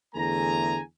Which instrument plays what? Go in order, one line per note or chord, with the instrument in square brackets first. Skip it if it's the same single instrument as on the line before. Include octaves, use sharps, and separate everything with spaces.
[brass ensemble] E2 D3 A3 G#4 G#5 A#5